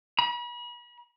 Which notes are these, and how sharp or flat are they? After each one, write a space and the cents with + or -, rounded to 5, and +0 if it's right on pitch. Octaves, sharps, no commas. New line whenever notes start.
B5 -40